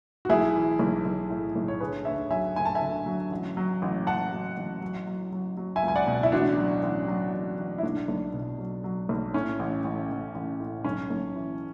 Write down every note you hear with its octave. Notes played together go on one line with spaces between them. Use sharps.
F#4
B1 E4 G#4
E3
B1
B1
A2
B1
C#5
D3 G#4 B4
D2 C#5 E5
F#3 E5 G#5
D2 G#5
A5
E5 G#5
D3
F#3
A1
F#3
A1
A1 F#5 A5
F#3
A1
F#3
F#3
F#3
F#3
E5 G#5
C#2
G#5
D5 F#5
B2
E4
A1 D4 F#4
F#3
A1
F#3
A1
A1
E4
B1 D4
B1
B2
F#3
F#3
B1
A2 C#4
A1
A1
A1
A1
A2
B1 C#4
B1
E3